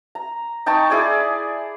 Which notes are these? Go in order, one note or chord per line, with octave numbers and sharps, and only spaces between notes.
A#5
D#4 G5 A5 C#6
E4 G#4 D5 G#5